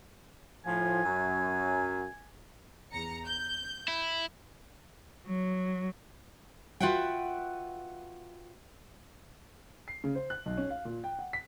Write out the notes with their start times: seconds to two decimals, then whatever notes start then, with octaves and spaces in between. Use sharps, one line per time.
0.65 A2 F3 G#5
1.05 F#2
2.92 E2 A#5 C#7
3.26 G6
3.88 E4
5.27 F#3
6.80 F4 F#4 B4 E5 F#5 G5
9.88 C7
10.04 C#3
10.15 C5
10.30 F#6
10.46 B1
10.58 C#4
10.70 F5
10.85 A#2
11.04 G5
11.19 F#5
11.33 B6